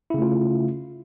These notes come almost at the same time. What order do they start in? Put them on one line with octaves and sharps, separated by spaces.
E4 C#3 A3 F4